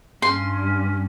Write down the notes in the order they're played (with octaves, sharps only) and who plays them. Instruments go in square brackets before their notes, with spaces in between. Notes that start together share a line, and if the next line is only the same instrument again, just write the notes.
[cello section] G2 [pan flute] C#4 [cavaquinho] C6